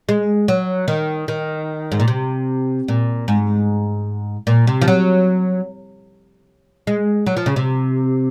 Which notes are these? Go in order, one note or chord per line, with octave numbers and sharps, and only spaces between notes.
G#3
F#3
D#3
D#3
G#2
A#2
C3
A#2
G#2
A#2
C3
F3
F#3
G#3
F#3
F3
C#3
C3